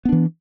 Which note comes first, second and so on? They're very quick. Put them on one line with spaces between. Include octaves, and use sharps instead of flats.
B3 D4 E3